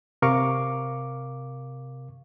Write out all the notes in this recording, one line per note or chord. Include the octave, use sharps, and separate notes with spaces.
C3 A#4 F5 C#6 D6